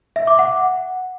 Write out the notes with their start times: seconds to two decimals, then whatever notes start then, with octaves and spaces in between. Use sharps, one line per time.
0.16 E5
0.27 D6
0.39 F#5